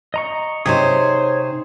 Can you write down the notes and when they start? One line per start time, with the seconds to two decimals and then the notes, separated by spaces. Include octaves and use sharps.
0.14 D#5 A#5 C#6
0.66 C3 D#4 G#4 C5 C#5